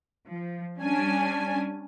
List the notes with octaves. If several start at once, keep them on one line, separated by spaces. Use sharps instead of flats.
F3
G3 C#4 D4 G#5